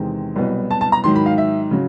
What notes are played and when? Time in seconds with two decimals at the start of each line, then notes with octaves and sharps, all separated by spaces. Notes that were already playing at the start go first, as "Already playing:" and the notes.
Already playing: E2 C3 D#3 G#3 C4
0.36 C2 B2 F#3 B3
0.71 A5
0.81 A5
0.92 A#5
1.04 G#2 D#3 F#3 C6
1.15 B5
1.26 F5
1.38 E5
1.71 C#3 F#3